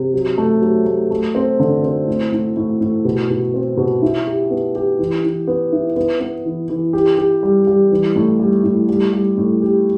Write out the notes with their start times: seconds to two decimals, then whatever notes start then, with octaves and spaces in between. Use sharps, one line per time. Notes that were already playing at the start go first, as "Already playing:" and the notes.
Already playing: C3
0.13 F#3
0.38 A3
0.61 F#3
0.86 A3
1.11 A3
1.35 C4
1.60 D3
1.83 C4
2.08 A2
2.32 A2
2.57 A2
2.81 A2
3.05 B2
3.30 B2
3.54 C4
3.77 B2
4.02 E4
4.27 G4
4.50 B3
4.75 G4
4.99 E3
5.24 E3
5.47 B3
5.72 E4
5.96 B3
6.20 B3
6.45 E3
6.69 E3
6.93 G4
7.18 G4
7.43 G3
7.67 G3
7.91 E3
8.16 A2
8.39 G3
8.64 A2
8.89 G3
9.12 G3
9.37 A2
9.62 G4